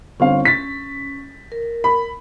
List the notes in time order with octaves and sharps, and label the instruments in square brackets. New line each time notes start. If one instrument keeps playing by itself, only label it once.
[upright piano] G1 C4 F5 [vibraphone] C#4
[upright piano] A6 B6
[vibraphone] A#4
[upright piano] B5